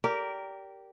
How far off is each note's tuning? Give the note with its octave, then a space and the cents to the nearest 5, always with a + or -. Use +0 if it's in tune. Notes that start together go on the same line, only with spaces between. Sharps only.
G4 -10 A#4 -5 D5 -25